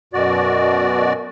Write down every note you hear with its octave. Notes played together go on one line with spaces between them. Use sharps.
F#2 B2 F#4 D5